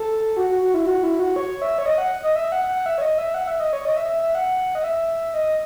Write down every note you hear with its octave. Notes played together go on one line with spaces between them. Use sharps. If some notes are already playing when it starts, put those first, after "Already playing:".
Already playing: A4
F#4
F#4
F#4
E4
F#4
E4
F#4
C#5
E5
C#5
D#5
F#5
D#5
E5
F#5
F#5
E5
C#5
D#5
E5
F#5
E5
D#5
C#5
D#5
E5
E5
E5
F#5
D#5
E5
D#5